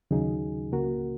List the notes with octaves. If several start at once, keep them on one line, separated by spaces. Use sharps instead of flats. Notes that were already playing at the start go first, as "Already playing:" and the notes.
D#2 C#3 F#3 D#4 G#4
C#2 C#3 A#3 F#4 A#4